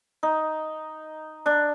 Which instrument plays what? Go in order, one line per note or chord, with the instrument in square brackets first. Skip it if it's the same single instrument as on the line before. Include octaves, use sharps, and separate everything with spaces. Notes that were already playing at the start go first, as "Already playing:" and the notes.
[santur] D#4
D4